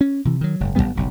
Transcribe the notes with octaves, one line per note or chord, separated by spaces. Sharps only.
C#4
C3 E3
D#3 F#3
F#1 G#2
G1 G2 G3 B3
F#1 B1 G2